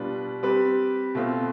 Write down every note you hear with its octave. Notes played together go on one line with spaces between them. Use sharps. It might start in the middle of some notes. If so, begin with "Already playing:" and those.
Already playing: B2 G3 D4 F4 B4
G3 C4 G4 B4
B2 A3 C4 F4